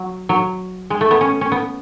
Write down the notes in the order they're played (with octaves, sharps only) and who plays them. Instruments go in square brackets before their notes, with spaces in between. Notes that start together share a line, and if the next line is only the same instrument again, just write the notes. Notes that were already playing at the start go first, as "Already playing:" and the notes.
Already playing: [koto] F#3
F#3
G#3
A3
B3
C#4
C#4
B3